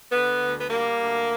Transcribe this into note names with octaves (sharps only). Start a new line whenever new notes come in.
D3 B3
D2
B3
G3 A#3
D2